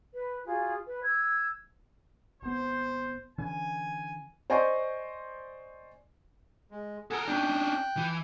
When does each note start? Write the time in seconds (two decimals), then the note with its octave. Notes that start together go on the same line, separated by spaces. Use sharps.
0.13 B4
0.45 F4 F#4 G#4
0.87 B4
1.02 E6 G6 G#6
2.42 G#1 B3 C5
3.38 D3 E3 C#4 G#5
4.50 C5 D5 D#5 G#5 C6 C#6
6.71 G#3
7.11 A4 A#4 F#5 G#5 D#6
7.28 C#4 D4 G5 F#6
7.97 E3